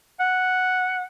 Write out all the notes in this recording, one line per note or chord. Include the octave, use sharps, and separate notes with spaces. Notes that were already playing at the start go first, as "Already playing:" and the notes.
F#5